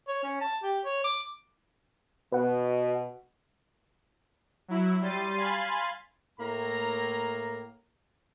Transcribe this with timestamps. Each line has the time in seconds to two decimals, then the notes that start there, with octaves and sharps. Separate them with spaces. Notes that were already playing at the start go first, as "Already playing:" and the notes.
0.08 C#5
0.24 C#4
0.41 A5
0.63 G4
0.85 C#5
1.04 D6
2.32 B2 B4 F#5
4.68 F#3 E4
5.01 G3 C6 A6 D#7
5.37 F5 G#5 B5 C6 A6
6.40 A2 A#3 A#5